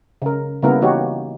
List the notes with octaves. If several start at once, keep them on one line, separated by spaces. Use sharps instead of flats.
C#3 A#4
C#3 G3 A#3 B3 E4 A#4
E3 A#3 D#4 F#4 G4 C#5